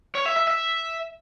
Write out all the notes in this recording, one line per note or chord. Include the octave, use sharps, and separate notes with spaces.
C#5
E5
E5
E5